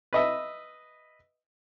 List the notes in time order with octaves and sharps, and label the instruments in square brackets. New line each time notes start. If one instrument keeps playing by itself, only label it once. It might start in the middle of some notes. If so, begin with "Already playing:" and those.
[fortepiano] B4 D#5 E5